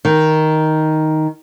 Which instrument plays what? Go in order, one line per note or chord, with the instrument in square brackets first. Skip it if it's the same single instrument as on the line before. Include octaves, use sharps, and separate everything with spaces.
[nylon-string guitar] D#3